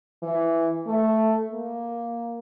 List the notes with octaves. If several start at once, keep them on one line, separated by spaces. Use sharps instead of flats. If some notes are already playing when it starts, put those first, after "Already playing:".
E3
A3
A#3